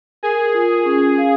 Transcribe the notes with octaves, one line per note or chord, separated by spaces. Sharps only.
G#4 A#4
F4
C#4
F5